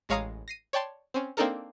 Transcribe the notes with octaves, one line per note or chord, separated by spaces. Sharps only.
A1 G#3 C#5 F5 A#5 D#6
A#6 C7 D#7
C#5 D5 G5 A5 C6
C4 C#4
A#3 C4 D4 D#4 A4 A#4